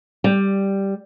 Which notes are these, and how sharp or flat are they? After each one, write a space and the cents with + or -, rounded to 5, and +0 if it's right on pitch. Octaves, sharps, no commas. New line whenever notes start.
G3 +0